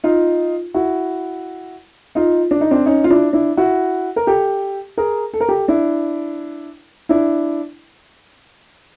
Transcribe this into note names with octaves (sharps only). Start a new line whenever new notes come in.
D#4 F4
E4 F#4
D#4 F4
D4
D#4
C4 D4
C#4 D#4
F4
D4 E4
D4 E4
E4 F#4
A#4
G4 A4
G#4 A#4
A4
A#4
G4 A4
D4 E4
D4 E4